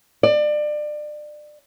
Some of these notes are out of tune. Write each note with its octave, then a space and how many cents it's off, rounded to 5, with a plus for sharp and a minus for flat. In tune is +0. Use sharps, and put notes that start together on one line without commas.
D5 +30